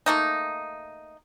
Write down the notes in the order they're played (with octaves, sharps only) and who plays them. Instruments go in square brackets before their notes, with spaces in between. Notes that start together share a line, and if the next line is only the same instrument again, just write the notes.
[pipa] A3 A#3 D#4